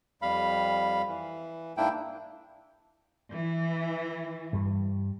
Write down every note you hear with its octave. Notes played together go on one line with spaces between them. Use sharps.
F2 G3 F5 B5
E3
G#2 A#3 D4 E4 G5
E3
G2 G3